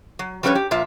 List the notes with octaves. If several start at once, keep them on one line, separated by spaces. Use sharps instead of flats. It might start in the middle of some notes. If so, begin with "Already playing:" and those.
F#3
F3 G3 C#4 A#4 B4 C#5
G4
A#2 F3 F4 E5